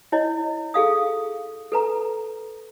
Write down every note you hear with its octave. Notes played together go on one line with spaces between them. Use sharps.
E4 C#5 D#5
G#4 A4 F5 D#6
A4 B4 A#5